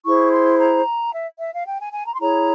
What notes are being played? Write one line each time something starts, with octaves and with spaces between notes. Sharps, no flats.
E4 G#4 C5 C#6
C6
A#5
E5
E5
F5
G5
G#5
G#5
A#5
C6
E4 G#4 C#5 A#5